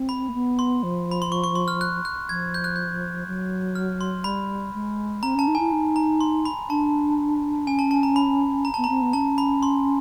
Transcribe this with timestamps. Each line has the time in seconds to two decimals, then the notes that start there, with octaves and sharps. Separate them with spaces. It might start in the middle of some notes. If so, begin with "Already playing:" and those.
Already playing: C4
0.09 B5
0.29 A#3
0.34 B3
0.59 C6
0.83 F3
1.12 B5
1.22 C6
1.32 C#6
1.44 C#6
1.55 C6
1.68 F6
1.81 F#6
2.05 F#6
2.29 F3 G#6
2.54 G6
2.64 F#6
2.76 G6
3.27 F#3
3.75 F6
4.01 C6
4.24 G3 B5
4.74 G#3
5.23 C4 A#5
5.35 C#4 A5
5.47 D#4
5.55 E4 G#5
5.72 D#4
5.96 A#5
6.21 C6
6.45 B5
6.69 D4 A5
7.67 C#4 G#5
7.79 A5
7.91 A5
8.03 A#5
8.16 B5
8.65 A#5
8.74 B3 A5
8.84 A#5
8.89 C4
9.01 B3
9.13 C#4 A5
9.38 B5
9.63 C6